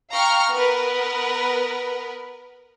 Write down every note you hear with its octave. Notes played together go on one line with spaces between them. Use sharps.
F5 G5 A#5 C#6 F6
B3 A#4 B4